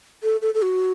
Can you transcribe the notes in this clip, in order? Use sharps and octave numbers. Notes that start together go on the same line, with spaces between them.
A4
A4
A4
F#4